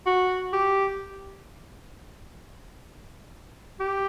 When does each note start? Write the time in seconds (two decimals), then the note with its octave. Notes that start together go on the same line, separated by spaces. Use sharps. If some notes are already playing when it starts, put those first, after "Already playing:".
0.06 F#4
0.53 G4
3.80 G4